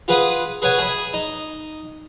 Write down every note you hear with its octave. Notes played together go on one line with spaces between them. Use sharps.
F4 G#4 B4 F#5 B5 D#6
G#4 B4 C#5 F#5 G#5
G#4 E5 G#5 B5
D#4